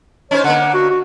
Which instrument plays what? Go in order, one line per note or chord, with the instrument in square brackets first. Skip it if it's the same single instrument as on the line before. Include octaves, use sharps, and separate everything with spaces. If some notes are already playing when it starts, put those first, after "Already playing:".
[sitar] C#4 D#4 C5 [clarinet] C#5
[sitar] D3 A#3 [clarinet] F#5
[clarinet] F#4
F#4